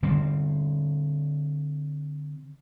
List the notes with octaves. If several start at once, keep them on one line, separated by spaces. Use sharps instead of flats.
D3 G3 C4